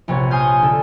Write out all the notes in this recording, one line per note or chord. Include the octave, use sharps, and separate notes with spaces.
A#1 C3 B3 C#5
G#5 C6 D#6 F6 G6
D3 A4